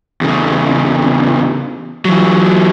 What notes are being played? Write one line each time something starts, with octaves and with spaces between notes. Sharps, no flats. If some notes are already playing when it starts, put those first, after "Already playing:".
E2 C#3
E3 F#3